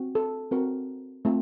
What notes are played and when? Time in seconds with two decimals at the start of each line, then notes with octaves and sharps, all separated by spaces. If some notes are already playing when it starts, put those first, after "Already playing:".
Already playing: C4 F#4
0.15 A4
0.51 C4 F#4 A#4
1.25 A3 C4 F4